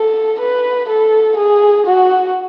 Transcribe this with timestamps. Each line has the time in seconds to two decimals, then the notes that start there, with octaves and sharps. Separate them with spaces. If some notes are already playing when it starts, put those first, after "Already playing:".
Already playing: A4
0.40 B4
0.89 A4
1.37 G#4
1.86 F#4